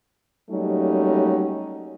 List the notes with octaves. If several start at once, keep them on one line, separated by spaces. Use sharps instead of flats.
F#3 G3 A3 A#3 C#4 D#4